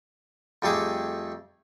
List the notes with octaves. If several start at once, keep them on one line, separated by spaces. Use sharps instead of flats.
F2 G3 A3 G#4 D6